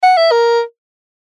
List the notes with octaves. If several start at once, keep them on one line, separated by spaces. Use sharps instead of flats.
F#5
E5
A#4